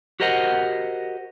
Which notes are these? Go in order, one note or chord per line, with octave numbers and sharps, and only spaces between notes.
F#4 G4 A#4 C5 D#5 F#5